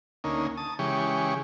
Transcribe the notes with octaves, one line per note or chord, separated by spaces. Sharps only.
D2 A#3 C#4 D#4
A5 D#6
C#3 E3 G#3 G4 C#6